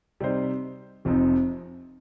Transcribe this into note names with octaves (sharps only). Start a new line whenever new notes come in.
C3 G3 D#4 C5 D#5
F1 F2 C3 F3 D#4